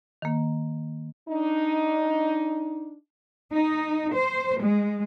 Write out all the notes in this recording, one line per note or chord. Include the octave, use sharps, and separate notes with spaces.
D#3 A#3
D4 D#4
D#4
C5
G#3